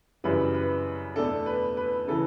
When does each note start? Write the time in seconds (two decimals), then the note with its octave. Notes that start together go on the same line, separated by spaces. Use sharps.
0.24 F#2 C#3 E3 G3 B4
0.54 B4
1.16 E2 B2 A3 D4 A4
1.46 B4
1.77 B4
2.07 C#3 E3 A4